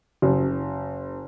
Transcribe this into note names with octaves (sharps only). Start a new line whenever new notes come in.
F#1